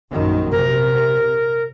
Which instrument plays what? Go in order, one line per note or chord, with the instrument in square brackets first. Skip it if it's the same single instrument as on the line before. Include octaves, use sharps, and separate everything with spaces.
[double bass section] A#1 F#2 D#3
[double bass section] C3 [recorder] A#4